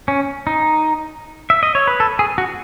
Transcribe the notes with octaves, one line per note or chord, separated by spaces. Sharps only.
C#4
D#4
E5
D#5
C#5
B4
A4
G#4
F#4